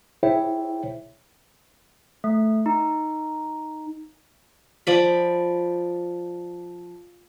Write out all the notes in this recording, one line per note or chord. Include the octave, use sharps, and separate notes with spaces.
E4 G#4 C5 C#5 E5 G5
A3
D#4
F3 D5 B5